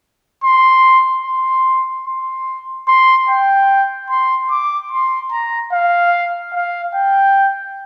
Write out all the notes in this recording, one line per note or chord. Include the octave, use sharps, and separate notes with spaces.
C6
C6
C6
C6
G5
C6
D6
C6
A#5
F5
F5
G5